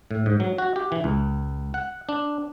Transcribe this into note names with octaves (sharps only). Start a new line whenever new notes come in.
A2
G#2
F#3
F#4
G4
E3
C#2
F#5
D4